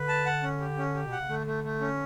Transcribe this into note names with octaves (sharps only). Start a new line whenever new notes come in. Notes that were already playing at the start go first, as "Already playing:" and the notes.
Already playing: D3 B4
A5
F#5
C#4
G4
C#4
G4
B2
F#5
C#3
D3 A3
A3
A3
C#4